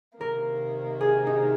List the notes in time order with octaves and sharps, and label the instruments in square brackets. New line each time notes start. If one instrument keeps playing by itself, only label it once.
[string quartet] C3 D#3 A#3 [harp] A#4
[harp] G#4
D#4